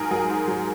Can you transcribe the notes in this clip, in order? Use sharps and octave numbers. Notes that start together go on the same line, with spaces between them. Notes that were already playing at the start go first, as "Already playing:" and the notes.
Already playing: G#2 F#3 G#4 A#4
F#3 G#4
G#2
F#3